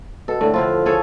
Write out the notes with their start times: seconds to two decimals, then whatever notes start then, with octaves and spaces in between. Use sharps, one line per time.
0.28 B2 A4
0.41 A2 D3
0.54 D3 F3 E4 F4
0.86 G#4 A4 C#5